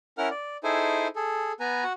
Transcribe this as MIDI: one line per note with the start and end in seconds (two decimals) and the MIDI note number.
0.18 0.29 61
0.18 0.29 64
0.18 0.29 70
0.18 0.29 78
0.18 0.29 89
0.30 0.57 74
0.64 1.08 63
0.64 1.08 64
0.64 1.08 68
0.64 1.08 69
0.64 1.08 72
0.64 1.08 80
1.16 1.52 68
1.16 1.52 69
1.60 1.84 59
1.60 1.84 71
1.60 1.84 80
1.60 1.84 82
1.84 1.93 66
1.84 1.93 78